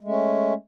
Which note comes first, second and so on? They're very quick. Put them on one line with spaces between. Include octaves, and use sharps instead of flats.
G#3 A3 C#4